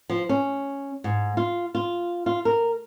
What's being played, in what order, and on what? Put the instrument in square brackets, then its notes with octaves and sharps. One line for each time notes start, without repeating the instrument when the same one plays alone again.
[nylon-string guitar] F3
C#4
G#2
F4
F4
F4
A#4